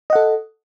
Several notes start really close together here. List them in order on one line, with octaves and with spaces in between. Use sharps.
D#5 F#5 A4